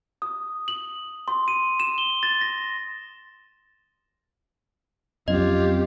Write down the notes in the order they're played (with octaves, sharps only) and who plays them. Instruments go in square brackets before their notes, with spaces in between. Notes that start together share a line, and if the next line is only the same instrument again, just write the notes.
[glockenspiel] D#6
F#7
C6
D#7
E7
G7
A6
A#6
[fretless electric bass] F2 F#3 C#4 [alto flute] C4 [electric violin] F4 G4 [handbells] D#5